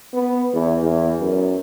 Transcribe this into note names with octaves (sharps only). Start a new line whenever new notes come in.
B3
E2
E2
F#2